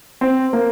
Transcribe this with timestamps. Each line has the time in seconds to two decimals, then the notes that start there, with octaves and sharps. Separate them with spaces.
0.21 C4
0.53 A#3